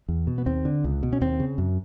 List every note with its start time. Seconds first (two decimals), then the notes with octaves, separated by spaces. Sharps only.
0.08 E2
0.27 B2
0.38 B3
0.46 D#2 C4
0.65 D3
0.84 C#2
1.03 B2
1.13 C#4
1.21 D#2 C4
1.40 C#3
1.58 F#2